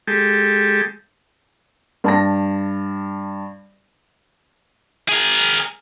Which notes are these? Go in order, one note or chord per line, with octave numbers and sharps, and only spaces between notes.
G#3 G4 A4
G2 A5 A#6
G#4 A#4